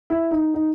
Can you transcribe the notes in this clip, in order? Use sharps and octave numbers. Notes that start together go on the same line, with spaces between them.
E4
D#4
D#4